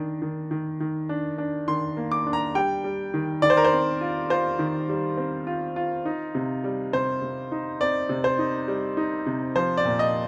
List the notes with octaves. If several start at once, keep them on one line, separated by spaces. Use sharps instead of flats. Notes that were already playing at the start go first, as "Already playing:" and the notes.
Already playing: D#3 D4
D#3
D#3
D#3
D4
D4
D#3 C6
A#3
D6
D4
A#5
G3 G5
G3
D#3
D#3 D5
C5
A#4
C5
C4
F4
F4 C5
D#3
G3
C4
F4
F4
D#4
C3
G3
C3 C5
C3
D#4
C4 D5
C3
C5
D#4
G3
D#4
C3
F3 C5
D5
A#2
D#5